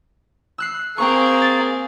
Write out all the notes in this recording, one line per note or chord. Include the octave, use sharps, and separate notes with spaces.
E6 F#6 C7
A#3 C4 G#4 G5 A#5 C#6
A6